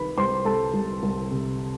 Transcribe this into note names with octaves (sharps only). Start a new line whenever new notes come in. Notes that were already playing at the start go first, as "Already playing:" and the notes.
Already playing: C2 D#3 B4 B5
C2 C5 C6
C2 A4 A5
C2
C2
C3